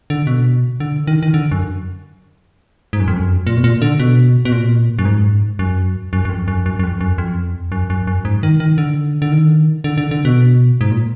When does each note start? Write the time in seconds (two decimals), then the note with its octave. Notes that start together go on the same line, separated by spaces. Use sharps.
0.10 D3
0.27 B2
0.80 D3
1.07 D#3
1.23 D#3
1.34 D3
1.51 F#2
2.93 G#2
3.00 F#2
3.08 F2
3.16 F#2
3.47 A#2
3.57 B2
3.64 A#2
3.82 D3
4.00 B2
4.45 B2
4.52 A#2
4.99 F#2
5.05 G#2
5.59 F#2
6.13 F#2
6.25 F#2
6.29 F2
6.48 F#2
6.66 F#2
6.79 F#2
6.83 F2
7.01 F#2
7.18 F2
7.72 F#2
7.90 F#2
8.07 F#2
8.25 G#2
8.43 D#3
8.60 D#3
8.78 D3
9.22 D3
9.32 D#3
9.84 D3
9.98 D3
10.11 D3
10.25 B2
10.81 G#2
10.91 A#2